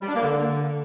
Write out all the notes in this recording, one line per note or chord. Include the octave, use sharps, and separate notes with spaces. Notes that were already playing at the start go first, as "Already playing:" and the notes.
G3
D4
A#3
D3